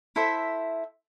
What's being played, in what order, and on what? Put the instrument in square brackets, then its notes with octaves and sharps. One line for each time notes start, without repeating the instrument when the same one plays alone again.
[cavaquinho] E4 A4 C5 E5